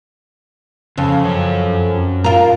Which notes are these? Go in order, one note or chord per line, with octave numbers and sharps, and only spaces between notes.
F2 C#3
F#2 C#5
F4 A#4